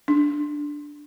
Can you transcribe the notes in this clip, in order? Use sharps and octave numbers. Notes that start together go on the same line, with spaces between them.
D4